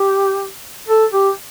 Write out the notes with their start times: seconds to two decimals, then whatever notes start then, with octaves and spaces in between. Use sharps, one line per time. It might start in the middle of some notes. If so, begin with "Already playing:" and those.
Already playing: G4
0.88 A4
1.13 G4